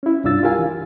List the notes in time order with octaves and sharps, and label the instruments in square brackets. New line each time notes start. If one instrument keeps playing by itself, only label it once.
[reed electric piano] C#4 E4
C2 G2 D4 F4 E6 A6
F4 G4 A#4 F5 G#5
E3